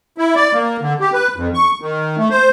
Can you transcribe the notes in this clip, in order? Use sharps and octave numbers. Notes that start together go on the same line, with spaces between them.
E4
D5
A#3
D3
G4
B4
F2
C#6
D#3
A3
C5